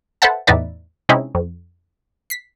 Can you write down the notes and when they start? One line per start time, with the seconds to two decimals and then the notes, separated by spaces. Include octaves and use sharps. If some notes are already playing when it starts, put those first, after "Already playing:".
0.22 A4 B4 C5 E5 F#5 A5
0.47 E2 A2 D#4 B4 D5 E5
1.09 C3 G#3 C4 C#4 D#4 E4
1.35 F2
2.30 B6 C7